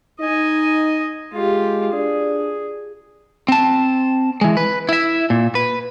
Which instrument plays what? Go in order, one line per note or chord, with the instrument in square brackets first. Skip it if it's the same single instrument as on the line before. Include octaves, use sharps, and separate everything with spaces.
[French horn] D#4 [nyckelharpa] D#5 G#5
[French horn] G#3 [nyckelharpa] F4 G4
[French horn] D4 [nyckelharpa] G#4
[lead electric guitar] C4 A5
E3 G#3
B4
E4 E5
A#2
B4